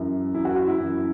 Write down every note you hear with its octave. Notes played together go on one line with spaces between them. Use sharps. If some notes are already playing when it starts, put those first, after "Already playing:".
Already playing: F#2 E3
F#2 E3 E4
F#4
F#4
E4
F#2 E3